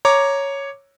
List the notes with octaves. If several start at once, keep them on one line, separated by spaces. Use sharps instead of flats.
C#5 A#5 D6